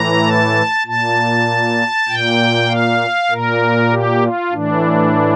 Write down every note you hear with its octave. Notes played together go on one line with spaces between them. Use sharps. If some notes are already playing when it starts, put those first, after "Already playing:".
Already playing: A2 E3 A#5
A5
A#2 A5
A#2 G5
F5
A#2 A#4
G4
F4
A2 E3 D4